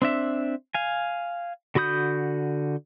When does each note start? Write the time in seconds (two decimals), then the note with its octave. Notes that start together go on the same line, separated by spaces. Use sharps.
0.02 C4 D4 E5
0.74 F5 G#5
1.75 D3 F#4 B5 D#6 G6